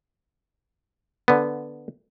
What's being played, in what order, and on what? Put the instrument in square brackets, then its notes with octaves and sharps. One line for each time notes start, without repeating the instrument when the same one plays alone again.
[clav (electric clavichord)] D3 B3